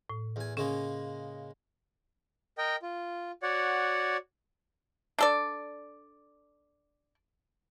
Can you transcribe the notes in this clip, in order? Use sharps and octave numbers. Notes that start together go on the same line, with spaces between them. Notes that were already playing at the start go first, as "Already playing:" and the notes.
A2
E2 G#5
C#3 G#3 A#3 C#4
A#4 D#5 G5
F4
F#4 C#5 D5 F#5
D4 A4 D5